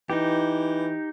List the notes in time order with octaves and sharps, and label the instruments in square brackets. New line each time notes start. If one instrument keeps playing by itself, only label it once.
[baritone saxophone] E3 [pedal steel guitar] D#4 G4